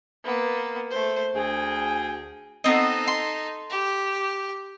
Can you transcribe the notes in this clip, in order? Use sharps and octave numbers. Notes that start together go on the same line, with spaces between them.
A#3 B3
A3 C5
D2 G#4 G5
B3 C4 D#4 A4 D#5
C6
G4